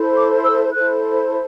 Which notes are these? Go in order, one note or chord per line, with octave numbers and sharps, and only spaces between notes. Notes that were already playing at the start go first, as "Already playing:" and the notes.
Already playing: E4 A4 C5
D6
E6
E4 A4 C5 F#6